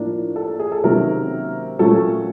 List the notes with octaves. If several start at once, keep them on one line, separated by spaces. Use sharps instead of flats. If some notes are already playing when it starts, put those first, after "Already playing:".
Already playing: A2 F3 A#3 D4
A4
G#4
A4
C3 D#3 F#3 A#3 C#4 A#4
A#2 F#3 A3 C#4 A4